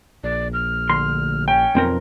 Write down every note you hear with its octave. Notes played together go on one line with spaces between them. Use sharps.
A#1 D5
F6
D2 C6
C#4 G5
B1 F2 C4 A#4